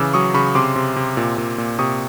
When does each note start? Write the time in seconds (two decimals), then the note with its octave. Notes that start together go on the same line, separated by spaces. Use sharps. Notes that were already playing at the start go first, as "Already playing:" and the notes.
Already playing: C#3 E3 D6 E6
0.14 F#3 C#6 D#6
0.34 C#3 B5 C#6
0.55 C3 C6 D6
0.76 C3
0.96 C3
1.17 A#2
1.38 A#2
1.58 A#2
1.79 C3 C#6 D#6